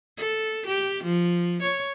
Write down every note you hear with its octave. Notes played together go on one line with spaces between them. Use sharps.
A4
G4
F3
C#5